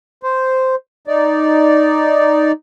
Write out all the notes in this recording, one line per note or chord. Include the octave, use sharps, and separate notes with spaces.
C5
D#4 D5